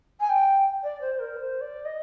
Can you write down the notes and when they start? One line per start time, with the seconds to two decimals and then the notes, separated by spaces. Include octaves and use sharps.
0.20 G#5
0.29 G5
0.83 D5
1.01 C5
1.19 A#4
1.37 C5
1.61 D5
1.85 D#5